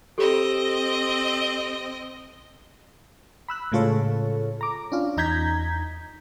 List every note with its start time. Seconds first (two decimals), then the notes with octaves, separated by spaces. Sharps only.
0.18 C4 G4 A4 D#5
3.48 B5 E6 F#6
3.72 A2 C#3 G#3 F4 A4 C#5
4.61 A#5 D6
4.92 C#4 D4 F4
5.17 E2 D#4 A#5 G6 G#6 B6